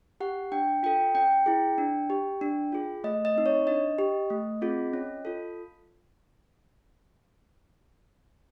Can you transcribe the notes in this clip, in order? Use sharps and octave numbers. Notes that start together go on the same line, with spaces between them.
G4 F#5
D4 G5
F4 A4 G5
C#4 G5
E4 G#4
D4
G4
D4
F4 G#4
A3 D#5
D#5
C4 D#4
C#5
D4 D#5
G4
A3
C4 F4 G#4
C#4
F4 A4